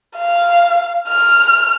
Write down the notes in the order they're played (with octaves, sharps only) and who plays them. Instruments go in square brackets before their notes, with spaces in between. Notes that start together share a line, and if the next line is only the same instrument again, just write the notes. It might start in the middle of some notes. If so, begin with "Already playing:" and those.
[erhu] F5
F6